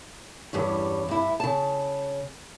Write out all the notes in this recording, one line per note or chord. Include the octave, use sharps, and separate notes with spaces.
E2 G2 G3 C#4
G2 E4
C#3 A5